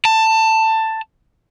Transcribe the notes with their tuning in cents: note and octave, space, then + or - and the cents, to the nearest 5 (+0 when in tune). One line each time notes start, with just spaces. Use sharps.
A5 +15